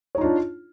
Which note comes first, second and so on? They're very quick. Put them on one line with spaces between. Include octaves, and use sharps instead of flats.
C#5 D#4 F4 D4